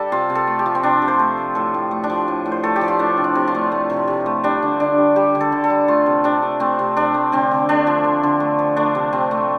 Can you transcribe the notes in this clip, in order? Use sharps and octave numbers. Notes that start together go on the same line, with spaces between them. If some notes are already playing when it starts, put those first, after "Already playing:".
Already playing: G3 D4 G4 A4
C3 F4
C3
A4
A3
G4
F3
C4
C3 D4
C3
C5
A3
F3
A2 A4
A2
A3
D4
F3
A2
A2
C5
A3 A4
G4
F3
F4
A3 D4
C3
D4
C3
F4
A3
A3
C3
C3
A3
G3 D4
D3
D3 D4
G3
G3 G4
D3
A4
D3
A4
G3
A3 F4
C3
C3 D4
A3
A3 C4
C3
C3 D4
A3
D3 C4
D3
A3 D4
F3
D3
D3
A3
F3
A3 D4
C3
C3 C4
A3